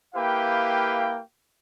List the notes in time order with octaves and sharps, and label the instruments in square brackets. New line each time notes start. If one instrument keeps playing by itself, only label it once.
[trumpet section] A#3 E4 G4 B4 F5 G5